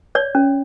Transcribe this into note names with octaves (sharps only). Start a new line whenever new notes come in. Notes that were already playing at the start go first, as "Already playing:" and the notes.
C#5 D5
C#4